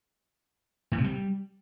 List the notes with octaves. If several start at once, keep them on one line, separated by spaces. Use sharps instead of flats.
A2
C3
G3